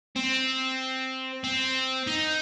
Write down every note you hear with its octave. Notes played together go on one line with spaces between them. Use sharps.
C4
C4
D#4